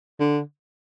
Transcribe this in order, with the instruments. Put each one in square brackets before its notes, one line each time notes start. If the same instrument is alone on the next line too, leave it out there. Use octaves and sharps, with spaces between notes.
[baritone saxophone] D3